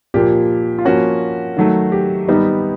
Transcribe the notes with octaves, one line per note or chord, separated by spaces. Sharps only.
A#2 F3 A#3 G4
F4
F3 A#3 C#4 F#4
D#3 F#3 A3
G4
D#3 G3 B3 D#4